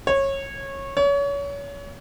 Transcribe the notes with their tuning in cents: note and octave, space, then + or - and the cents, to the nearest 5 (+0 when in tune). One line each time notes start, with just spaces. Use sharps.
C#5 -20
C#5 +30